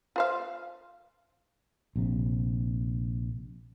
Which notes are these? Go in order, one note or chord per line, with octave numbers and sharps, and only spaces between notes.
F4 C5 F5
A#1 C3